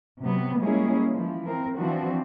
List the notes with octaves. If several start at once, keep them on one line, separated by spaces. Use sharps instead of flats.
C3 F#3 B3
G3 G#3 A#3 C#4 E4 G#4
E3 F3
C4 A#4
E3 F3 C4 D4 F#4